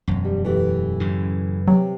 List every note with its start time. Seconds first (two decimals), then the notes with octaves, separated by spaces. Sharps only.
0.08 E1 F#2
0.25 G3
0.45 E3 A3 G4
1.00 F#2 A2 C#3
1.68 C3 F#3